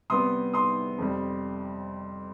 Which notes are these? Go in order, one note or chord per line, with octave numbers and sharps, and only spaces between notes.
C3 G3 B3 C6 D#6
C6 D#6
F2 C3 G3